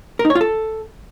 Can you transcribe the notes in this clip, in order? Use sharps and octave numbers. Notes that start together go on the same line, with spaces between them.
A#4
D#4
C#5
F4
A4